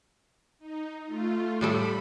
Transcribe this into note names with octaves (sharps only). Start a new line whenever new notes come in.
D#4
A3 F4
A2 G3 A4 B5